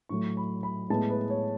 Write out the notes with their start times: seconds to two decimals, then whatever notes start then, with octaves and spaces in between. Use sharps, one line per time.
0.09 A2 F#3 A3 C#6
0.37 B5
0.63 B5
0.90 A2 G#3 B3 A5
1.10 B4
1.30 C#5